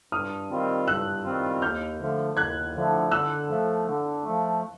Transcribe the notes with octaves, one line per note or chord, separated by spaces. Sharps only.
G2 D#6 F6
D#3 G3 C4 F4
G2 E6 F#6
D#3 G3 C4 F4
D#2 F6 G6
D3 F3 A3
D#2 F#6 G#6
D3 F3 A3
D3 E6 F#6
F3 A3
D3
F3 A3